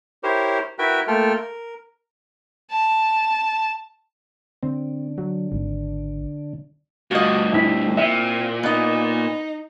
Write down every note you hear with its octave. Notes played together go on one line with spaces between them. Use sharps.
E4 G4 A#4 C5 C#5
E4 F#4 A#4 B4 E5 G5
A3 A#3 F4 A4 G5 F6
A#4
A5
D3 C4
F#3
G#1
D2 G2 F4 F#4 D#5
C4 E4 B6
A#2 E5
B3 D#4 D#5